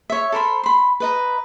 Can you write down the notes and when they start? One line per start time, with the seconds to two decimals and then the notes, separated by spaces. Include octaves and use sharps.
0.10 C#5 E5
0.32 A4 A#4 C5 B5
0.63 B5 C6
1.00 B4 D#5 A#5